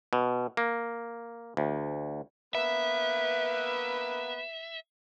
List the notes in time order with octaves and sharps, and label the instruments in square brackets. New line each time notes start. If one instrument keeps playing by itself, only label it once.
[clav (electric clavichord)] B2
A#3
D2
[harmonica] A#3 B3 B4 [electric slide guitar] E5